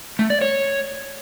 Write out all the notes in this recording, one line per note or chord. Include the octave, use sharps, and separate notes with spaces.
A3
D5
C#5